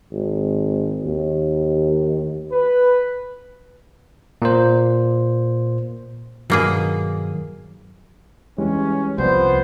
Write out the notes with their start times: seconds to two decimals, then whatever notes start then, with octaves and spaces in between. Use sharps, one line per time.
0.12 G#1
1.04 D#2
2.53 B4
4.42 A#2 A#3 C5
6.50 G2 B2 D#3 F#3 A#3 G#4
8.58 E3 G3 G#3 C#4
9.18 C2 F3 B3 C5 D5